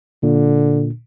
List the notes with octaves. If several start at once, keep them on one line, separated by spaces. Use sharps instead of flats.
A#2 D3